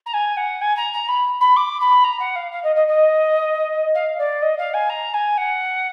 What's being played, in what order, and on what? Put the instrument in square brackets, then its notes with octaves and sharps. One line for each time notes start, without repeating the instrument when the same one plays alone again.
[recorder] A#5
G#5
F#5
G#5
A#5
A#5
B5
B5
D6
B5
A#5
F#5
F5
F5
D#5
D#5
D#5
F5
D5
D#5
F5
G#5
A#5
G#5
F#5